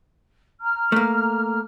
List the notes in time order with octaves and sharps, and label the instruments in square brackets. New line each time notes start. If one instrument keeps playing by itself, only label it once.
[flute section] A#5 F6
[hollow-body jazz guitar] A3 A#3